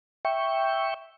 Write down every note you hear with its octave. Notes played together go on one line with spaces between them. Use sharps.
E5 G5 C#6